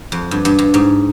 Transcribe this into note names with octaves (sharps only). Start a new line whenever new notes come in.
F2
G2
G2
G2
G#2